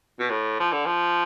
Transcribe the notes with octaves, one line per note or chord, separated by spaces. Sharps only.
B2
A2
F3
D3
F3